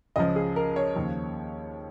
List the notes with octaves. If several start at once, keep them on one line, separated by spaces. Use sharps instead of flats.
C#2 C#3 F3 D#5
G#4
A#4
C#5
D#2 C#3 F3